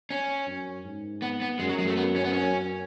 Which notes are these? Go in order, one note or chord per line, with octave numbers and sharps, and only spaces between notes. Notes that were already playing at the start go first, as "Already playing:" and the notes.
C#4
F#2
G#2
B3
B3
F#2 G#3
F#3
G#3
A3
B3
C#4
B3
C#4